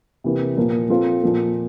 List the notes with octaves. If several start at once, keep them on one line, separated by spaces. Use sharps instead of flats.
C3 E3 A#3
A#2 F3 A#3
F3 C4 F4 A4
A#2 F3 A#3